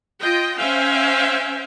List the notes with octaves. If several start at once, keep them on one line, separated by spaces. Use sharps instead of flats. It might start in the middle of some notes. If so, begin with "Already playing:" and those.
F4 D#5 G5
C#4 C5 E5 F5 G5 G#5